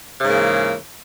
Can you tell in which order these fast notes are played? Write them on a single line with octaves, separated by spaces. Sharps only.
C#3 G#2 A#3 E3